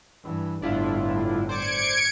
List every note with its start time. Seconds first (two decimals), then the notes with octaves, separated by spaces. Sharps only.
0.24 G2 E3
0.62 G1 A2 D4 E4 F4
1.49 C5 D5 D6 G#6 C#7 D7